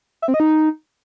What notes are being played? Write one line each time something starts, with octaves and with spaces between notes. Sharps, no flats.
E5
C4
D#5
D#4